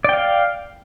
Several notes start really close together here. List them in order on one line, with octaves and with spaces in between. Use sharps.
D5 G5 F5